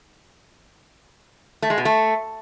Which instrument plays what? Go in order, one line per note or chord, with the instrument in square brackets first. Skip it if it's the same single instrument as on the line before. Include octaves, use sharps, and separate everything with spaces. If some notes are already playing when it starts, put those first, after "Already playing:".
[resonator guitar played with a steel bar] A3
G#3
B2
A3